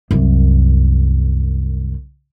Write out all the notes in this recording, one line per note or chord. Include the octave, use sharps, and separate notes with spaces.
C2 F#2